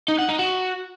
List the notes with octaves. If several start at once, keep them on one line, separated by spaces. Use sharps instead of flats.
D#4
F#5
D#4
F#4